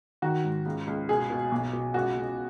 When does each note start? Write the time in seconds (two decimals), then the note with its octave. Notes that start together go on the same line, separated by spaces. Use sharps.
0.22 D#3 F#4
0.44 G#2
0.66 C#2
0.87 C#2
1.08 B2 G#4
1.30 B2
1.52 B1
1.73 B2
1.94 C#2 F#4
2.16 C#2